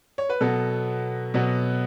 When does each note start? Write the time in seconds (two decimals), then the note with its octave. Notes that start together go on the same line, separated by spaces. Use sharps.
0.18 C#5
0.29 B4
0.41 B2 F#3 B3 A4
1.34 B2 F#3 B3